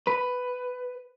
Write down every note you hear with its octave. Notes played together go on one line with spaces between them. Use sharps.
B4